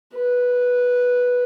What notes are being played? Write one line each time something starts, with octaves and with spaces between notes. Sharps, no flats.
B4